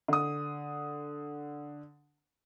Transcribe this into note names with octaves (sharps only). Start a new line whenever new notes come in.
D3 D#6